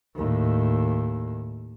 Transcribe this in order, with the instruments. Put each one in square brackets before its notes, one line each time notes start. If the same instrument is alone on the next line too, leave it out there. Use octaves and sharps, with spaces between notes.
[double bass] D#2 A2